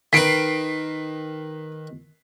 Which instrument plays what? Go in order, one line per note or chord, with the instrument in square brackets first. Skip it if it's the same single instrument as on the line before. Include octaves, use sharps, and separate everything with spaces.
[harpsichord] D#3 B4 [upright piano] B6 C7 D7